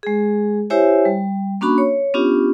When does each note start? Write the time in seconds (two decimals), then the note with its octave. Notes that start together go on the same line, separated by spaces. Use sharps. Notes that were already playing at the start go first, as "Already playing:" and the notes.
0.03 G#3 G#4
0.70 E4 G4 C5 C#5 E5 G#5
1.05 G3
1.61 A#3 C#4 D4 F#4 B5 C#6
1.78 C#5
2.14 B3 C#4 D4 F4 G4